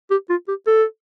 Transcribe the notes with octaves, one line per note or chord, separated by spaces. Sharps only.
G4
F4
G4
A4